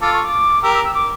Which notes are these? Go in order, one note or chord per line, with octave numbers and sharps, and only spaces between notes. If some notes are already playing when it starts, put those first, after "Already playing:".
F4 A4 D6
C#6
D6
G4 A#4 E6
E6
E6
D6